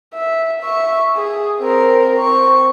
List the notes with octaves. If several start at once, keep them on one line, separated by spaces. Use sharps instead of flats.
E5
E5 C#6
G#4
C4 A#4
C4 C#6